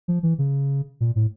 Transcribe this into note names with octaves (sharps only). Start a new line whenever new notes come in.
F3
E3
C#3
A#2
A2